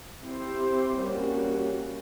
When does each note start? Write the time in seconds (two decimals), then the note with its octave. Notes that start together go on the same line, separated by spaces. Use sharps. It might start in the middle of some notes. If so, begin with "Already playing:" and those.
0.21 C4 E4 G4 C5
0.96 G3 A#3 C#4 F#4